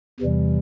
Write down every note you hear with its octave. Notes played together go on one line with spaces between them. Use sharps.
E2 C3 E3 G3